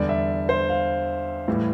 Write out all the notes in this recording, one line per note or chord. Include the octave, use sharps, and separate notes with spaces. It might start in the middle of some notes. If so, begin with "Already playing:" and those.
Already playing: E2 D3 G3 D5
E5
C5
F5
A2 E3 G3